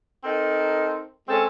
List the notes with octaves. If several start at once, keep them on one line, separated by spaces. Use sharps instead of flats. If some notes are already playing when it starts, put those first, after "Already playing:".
C4 D#4 A4 A#4
G#3 C4 C#4 A4